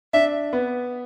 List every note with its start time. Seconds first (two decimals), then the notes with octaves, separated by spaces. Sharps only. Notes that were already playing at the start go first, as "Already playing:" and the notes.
0.13 D4 E5
0.53 B3